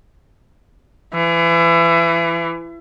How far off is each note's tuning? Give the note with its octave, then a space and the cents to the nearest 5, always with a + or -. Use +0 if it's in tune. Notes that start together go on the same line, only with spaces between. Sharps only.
E3 +30